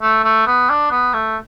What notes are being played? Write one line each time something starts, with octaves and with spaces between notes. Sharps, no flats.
A3
A3
B3
D4
B3
A3